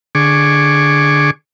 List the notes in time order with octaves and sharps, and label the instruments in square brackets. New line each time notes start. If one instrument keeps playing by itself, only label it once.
[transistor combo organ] D3 G#4 C#6 D6